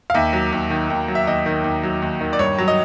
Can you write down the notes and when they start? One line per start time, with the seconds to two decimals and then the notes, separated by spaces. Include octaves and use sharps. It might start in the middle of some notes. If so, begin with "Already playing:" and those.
0.10 F5
0.14 D#2 E5
0.33 F#3
0.52 D#2
0.70 D#3
0.90 D#2
1.08 F#3
1.15 E5
1.27 D#2 D#5
1.46 D#3
1.64 D#2
1.83 F#3
2.02 D#2
2.21 D#3
2.33 D5
2.39 G2 C#5
2.58 F#3
2.68 D#5